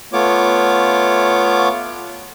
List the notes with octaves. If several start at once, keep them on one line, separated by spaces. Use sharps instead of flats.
A3 B3 F4 C#5 D6